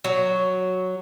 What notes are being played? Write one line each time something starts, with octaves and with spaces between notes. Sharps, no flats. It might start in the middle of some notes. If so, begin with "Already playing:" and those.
F#3